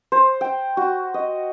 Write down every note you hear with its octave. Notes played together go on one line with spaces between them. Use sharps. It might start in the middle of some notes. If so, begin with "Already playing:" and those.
C5
G5
F#4
D#5